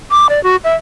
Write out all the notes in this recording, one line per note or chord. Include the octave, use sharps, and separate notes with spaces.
D6
D5
F#4
E5